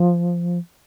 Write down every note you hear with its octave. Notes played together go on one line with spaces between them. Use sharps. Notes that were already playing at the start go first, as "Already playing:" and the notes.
Already playing: F3